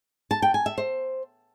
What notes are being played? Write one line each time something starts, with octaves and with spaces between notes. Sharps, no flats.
A5
G5
G#5
E5
C5